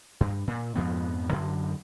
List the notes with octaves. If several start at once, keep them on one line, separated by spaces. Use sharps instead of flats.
G2
A#2
F2 G#2 F3 B3
F#2 D3